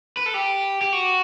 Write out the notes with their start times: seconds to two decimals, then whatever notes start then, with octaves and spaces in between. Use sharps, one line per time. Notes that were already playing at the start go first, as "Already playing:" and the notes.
0.17 B4
0.26 A4
0.34 G4
0.81 G4
0.93 F#4